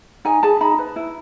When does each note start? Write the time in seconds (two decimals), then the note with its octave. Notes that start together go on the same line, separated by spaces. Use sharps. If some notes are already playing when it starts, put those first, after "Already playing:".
0.25 D#4 G#5
0.43 G#4 A5
0.61 D#4 B5
0.78 B4
0.96 E4